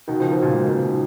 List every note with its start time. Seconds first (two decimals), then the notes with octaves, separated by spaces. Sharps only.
0.08 B2 D#3
0.20 C#3 F3
0.31 B2 D#3
0.42 A#2 C#3
0.54 G#2 B2
0.69 A#2 C#3
0.85 B2 D#3